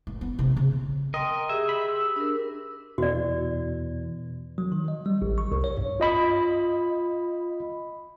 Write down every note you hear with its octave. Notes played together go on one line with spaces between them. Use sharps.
D1
B3
A#1 C3
C#3
A#4 D#5 G5 C6
G4 G#4 E5
B5
E6
D4 A#4
E2 B2 E3 F#4 D5
F#3
D#3
D#5
G3
A1
C#6
C2
C#5
G2
F4 D#5 B5